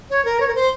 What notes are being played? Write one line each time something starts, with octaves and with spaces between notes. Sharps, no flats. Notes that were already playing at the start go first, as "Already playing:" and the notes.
C#5
A#4
C#5
A#4
C5